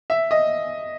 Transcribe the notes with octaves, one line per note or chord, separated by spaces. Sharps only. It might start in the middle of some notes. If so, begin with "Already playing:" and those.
E5
D#5